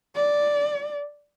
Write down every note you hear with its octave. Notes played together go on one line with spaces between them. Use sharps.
D5